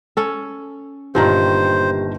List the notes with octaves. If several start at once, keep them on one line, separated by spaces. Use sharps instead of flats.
C#4 A4
G1 A#2 D#3 G4 C5 A5 A#5